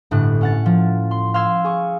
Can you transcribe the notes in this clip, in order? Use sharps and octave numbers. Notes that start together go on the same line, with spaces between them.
G1 A2 F#6
C#4 F#5 A6
F3
C6
F5 C6 E6 G#6
G#4 C#6